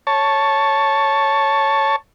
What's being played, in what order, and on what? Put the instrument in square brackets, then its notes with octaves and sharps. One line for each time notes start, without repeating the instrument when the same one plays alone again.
[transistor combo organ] C#5 A5